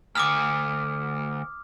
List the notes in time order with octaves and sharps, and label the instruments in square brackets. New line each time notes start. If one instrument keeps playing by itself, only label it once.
[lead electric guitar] D2 [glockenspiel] D6 D#6 F6